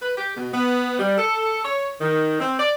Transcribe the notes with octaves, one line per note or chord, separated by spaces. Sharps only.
B4
G4
B2
B3
G3
A4
C#5
D#3
C4
D5